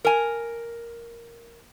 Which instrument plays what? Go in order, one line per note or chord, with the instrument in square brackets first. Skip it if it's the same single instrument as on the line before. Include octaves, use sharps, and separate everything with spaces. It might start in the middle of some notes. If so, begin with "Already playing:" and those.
[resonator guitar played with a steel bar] A#4 G#5